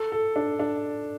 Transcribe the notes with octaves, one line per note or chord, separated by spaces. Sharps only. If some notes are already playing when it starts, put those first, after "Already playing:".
Already playing: A4
A4
D4
D4